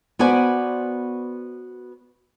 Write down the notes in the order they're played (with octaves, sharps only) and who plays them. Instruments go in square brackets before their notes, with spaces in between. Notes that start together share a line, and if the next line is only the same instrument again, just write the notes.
[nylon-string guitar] B3 F#4 B4 C5 D5 G#5